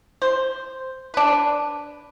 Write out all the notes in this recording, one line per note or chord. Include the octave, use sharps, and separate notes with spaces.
C5
D4 B4